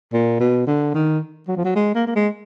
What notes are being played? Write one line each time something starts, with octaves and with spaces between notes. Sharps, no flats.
A#2
B2
D3
D#3
F#3
F3
F#3
G#3
A#3
A#3
G#3